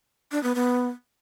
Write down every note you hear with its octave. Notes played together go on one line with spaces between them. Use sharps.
D4
B3
B3